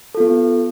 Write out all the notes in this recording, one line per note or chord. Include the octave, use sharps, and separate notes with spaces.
B3 F4 A4